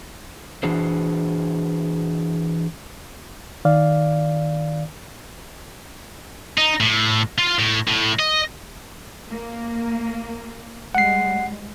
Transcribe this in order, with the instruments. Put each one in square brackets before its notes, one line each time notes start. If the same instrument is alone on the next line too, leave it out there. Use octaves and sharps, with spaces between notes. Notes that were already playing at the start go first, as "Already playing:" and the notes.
[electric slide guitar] E3 D4 F#4 G#4 C5
[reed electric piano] D#3 D5 F5
[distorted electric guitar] D#4
A2
F4
A2
A2
D#5
[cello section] A#3
[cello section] G3 G#3 [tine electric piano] F#5 C7